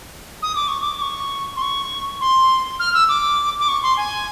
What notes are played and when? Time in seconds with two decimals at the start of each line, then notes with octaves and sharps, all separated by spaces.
0.42 D#6
0.56 D6
0.68 C#6
0.81 D6
0.98 D6
1.02 C#6
1.56 C6
1.62 C#6
2.21 C6
2.80 F6
2.94 E6
3.08 D6
3.59 D6
3.68 C#6
3.83 C6
3.97 G#5